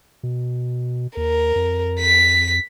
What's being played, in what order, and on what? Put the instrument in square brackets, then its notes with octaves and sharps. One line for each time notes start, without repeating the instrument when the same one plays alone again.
[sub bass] B2
[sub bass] D#2 [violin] A#4
[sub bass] F2
[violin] B6